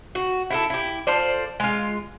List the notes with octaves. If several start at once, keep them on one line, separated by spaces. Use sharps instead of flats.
F#4
E4 F#4 A4
E4 G4
F4 A4 C5 D5
G#3 F4